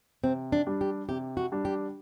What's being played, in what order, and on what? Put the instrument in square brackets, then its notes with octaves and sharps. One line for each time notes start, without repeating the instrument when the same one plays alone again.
[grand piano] C3 [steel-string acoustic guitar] C4
[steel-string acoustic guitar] D4
[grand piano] G3 D4
[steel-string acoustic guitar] G4
[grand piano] C3 [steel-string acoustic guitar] G4
[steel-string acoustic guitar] F#4
[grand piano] G3 D4
[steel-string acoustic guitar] G4